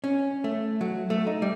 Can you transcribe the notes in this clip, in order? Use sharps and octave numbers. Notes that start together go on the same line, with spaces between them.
C#4
A3
F#3
A3
D#4
G3